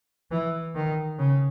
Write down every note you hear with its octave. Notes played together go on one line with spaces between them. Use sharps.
E3
D#3
C#3